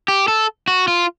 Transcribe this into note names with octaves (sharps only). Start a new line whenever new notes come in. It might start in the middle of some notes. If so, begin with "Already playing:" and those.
G4
A4
F#4
F4